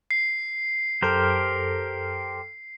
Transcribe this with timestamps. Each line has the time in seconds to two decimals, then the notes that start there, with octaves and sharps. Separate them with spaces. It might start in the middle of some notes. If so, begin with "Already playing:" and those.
0.11 C7
1.02 F#2 G4 A4 A#4 C5 F6